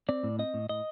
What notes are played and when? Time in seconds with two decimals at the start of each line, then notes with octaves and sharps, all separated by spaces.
0.09 C4 D5
0.23 A2
0.39 C4 D#5
0.54 A2
0.69 A2 D#5